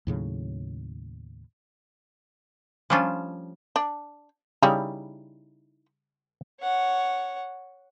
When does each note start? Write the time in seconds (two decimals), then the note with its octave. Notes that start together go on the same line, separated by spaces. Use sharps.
0.07 D#2 A2 C#3 F#3
2.90 F3 G3 A3 C#4 D4 F4
3.76 D4
4.63 C#3 G3 D#4 E4 A#5
6.61 C#5 F#5